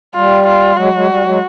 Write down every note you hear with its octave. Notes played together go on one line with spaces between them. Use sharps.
G3 F4
F4
F#3 G#3 F#4
F#3 G#3
G3
F#3 G#3